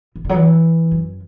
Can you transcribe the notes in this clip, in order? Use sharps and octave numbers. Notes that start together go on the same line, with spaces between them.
E3
D3
F#3
E3
F#2